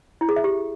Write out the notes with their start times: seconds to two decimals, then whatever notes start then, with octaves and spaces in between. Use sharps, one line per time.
0.21 E4
0.29 G#4
0.36 E5
0.44 G4